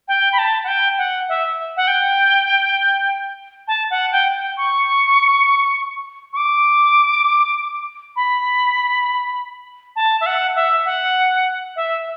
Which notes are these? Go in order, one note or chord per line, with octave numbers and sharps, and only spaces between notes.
G5
B5
A5
F#5
G5
F#5
E5
F#5
G5
A5
F#5
G5
G5
C#6
C#6
D6
B5
A5
E5
F#5
E5
F#5
E5